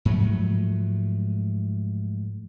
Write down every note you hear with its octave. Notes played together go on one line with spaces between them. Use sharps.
G#2 F3 F#3 A3